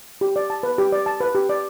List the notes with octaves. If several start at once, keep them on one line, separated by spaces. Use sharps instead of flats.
G4
D5
A5
B4
G4
D5
A5
B4
G4
D5